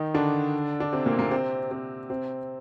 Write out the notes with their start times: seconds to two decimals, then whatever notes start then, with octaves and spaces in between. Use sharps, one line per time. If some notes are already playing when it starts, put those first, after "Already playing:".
Already playing: D#3 D#4
0.14 D3 D4
0.80 D4
0.93 C3 C4
1.06 A#2 A#3
1.18 A#2 A#3
1.31 C3 C4
1.71 C3 C4
2.10 C3 C4